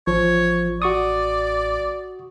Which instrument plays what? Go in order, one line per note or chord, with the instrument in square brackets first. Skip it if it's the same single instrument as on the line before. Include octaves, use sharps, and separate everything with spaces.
[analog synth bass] A1 [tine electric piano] F3 [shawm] C#5
[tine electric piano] F#4 C#6 D#6 [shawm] D5